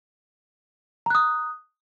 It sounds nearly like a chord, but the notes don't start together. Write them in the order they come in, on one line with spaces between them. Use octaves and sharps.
A#5 F#6 D#6